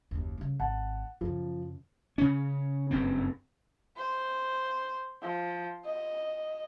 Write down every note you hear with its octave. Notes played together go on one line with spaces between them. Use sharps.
F#1 D#2
C#3 G3
G#1 F#5 A5
F#2 C#3 F3
C#3 C#4
F#1 G2 C4
C5
F3
D#5